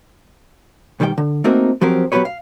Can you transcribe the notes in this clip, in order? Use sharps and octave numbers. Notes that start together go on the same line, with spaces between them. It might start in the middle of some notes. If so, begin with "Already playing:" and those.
B1 D#3 G3 C#5 G5
D3
A3 A#3 C4 D#4 F#4 A#4
F3 F#3 C4 G4 A#4
F#3 B3 F#4 G4 B4 C#5
F5